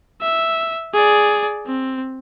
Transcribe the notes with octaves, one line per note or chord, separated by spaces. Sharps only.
E5
G#4 D5
C4